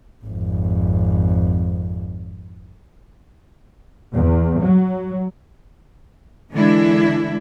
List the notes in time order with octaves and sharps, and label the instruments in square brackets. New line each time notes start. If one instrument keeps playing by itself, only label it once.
[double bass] G#1 F2
[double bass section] E2
F#3
[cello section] D3 E3 G#3 D4 E4